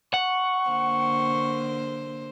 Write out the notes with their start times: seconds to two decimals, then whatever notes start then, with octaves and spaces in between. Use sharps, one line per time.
0.14 F#5 C#6
0.69 D3 A#3 C5